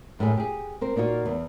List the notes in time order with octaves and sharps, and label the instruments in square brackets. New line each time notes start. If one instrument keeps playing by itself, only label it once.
[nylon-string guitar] F#2 A2 A#3 G#4
G4 G#4
C4 A#4 C5
A#2 A#3 D#4 F4 F#4
E2